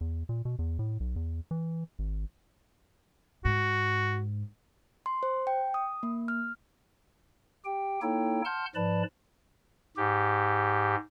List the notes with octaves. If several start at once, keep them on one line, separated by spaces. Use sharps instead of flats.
E2
A#2
B2
E2
A2
B1
E2
E3
G#1
G#2 F#4
C6
C5
G5
D#6
A#3
F6
G4 G5
A#3 D#4 E4 A4 C#5 G5
F#5 A5 C6 F6 G6
G#2 F3 B4 D5 A5 B5
G#2 G4